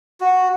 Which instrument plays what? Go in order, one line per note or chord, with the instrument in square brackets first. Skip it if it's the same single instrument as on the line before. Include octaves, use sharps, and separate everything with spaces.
[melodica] F#4